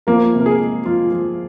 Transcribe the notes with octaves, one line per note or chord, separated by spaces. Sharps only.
F3 A#3 A#4
C3
A#4
G#4
G#3
F3 F4
F3